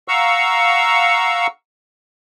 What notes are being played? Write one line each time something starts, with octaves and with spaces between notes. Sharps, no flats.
F5 F#5 A#5 C#6 E6